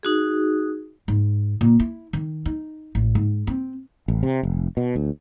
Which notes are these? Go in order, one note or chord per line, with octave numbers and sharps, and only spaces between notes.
D#4 F#4 G#4
G#2
A#2
E4
D#3
D#4
A1
G#2
C4
A1
C3
F1
B2
D2